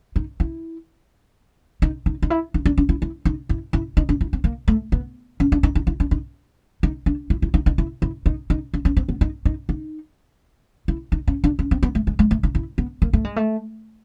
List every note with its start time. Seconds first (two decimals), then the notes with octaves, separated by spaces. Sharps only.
0.16 D#4
0.40 E4
1.82 D#4
2.06 D#4
2.22 D#4
2.30 E4
2.54 D#4
2.65 D4
2.78 D4
2.89 E4
3.02 E4
3.25 D#4
3.49 E4
3.73 E4
3.97 D#4
4.09 D4
4.21 E4
4.33 C4
4.44 A#3
4.68 A3
4.92 B3
5.40 C#4
5.52 D4
5.63 D#4
5.75 D#4
5.87 E4
6.00 D4
6.11 D#4
6.83 D#4
7.06 D4
7.30 E4
7.42 E4
7.54 D#4
7.66 D#4
7.78 E4
8.02 E4
8.26 D#4
8.50 D#4
8.74 D4
8.85 C#4
8.97 C4
9.09 B3
9.21 D#4
9.45 D#4
9.69 D#4
10.88 E4
11.12 D#4
11.28 C#4
11.44 D4
11.59 C#4
11.71 C4
11.83 B3
11.95 A3
12.07 G#3
12.19 G#3
12.31 A3
12.43 D#4
12.55 E4
12.78 B3
13.02 A#3
13.13 A3
13.25 G#3
13.36 A3